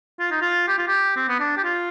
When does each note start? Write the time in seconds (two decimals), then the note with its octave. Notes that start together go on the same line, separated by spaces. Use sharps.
0.19 F4
0.31 D#4
0.42 F4
0.68 G4
0.78 F4
0.88 G4
1.16 C4
1.28 B3
1.40 D4
1.57 G4
1.64 F4